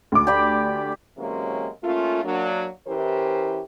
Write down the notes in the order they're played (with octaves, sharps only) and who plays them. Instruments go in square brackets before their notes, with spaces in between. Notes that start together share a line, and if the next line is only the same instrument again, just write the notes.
[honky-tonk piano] D2 D6
[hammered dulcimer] G4 D5 B5
[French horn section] C3 E3 F#3 G#3 A#3 C#4
A3 A#3 C#4 F4
F#3 A#3 D4
E3 C#4 E4 G4 A#4 C5